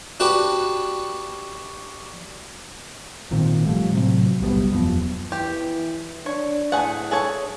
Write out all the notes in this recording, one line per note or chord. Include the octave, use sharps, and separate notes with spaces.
D4 F#4 G4 B4
G#1 A#2 D#3 C4
F3 G3 A3
A2 C3 F#3 C4
D#1 B1 G3 B3
E1 F#2 F3 B3
E3 G4
D4 C#5
A2 A3 G#4 F#5
G#4 A4 C#5